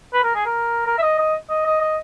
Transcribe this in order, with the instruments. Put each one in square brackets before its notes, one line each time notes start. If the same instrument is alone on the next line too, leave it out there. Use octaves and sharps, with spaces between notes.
[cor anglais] B4
A#4
G#4
A#4
A#4
E5
D#5
D#5
D#5
D#5
D#5